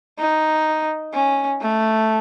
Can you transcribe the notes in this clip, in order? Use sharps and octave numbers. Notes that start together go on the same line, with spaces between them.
D#4
C#4
A3